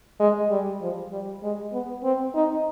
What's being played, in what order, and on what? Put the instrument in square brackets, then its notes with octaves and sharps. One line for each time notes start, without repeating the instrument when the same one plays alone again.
[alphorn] G#3
G3
F3
G3
G#3
B3
C4
D#4